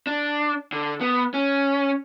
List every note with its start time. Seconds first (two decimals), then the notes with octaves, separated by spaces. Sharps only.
0.07 D4
0.73 D3
1.01 B3
1.34 C#4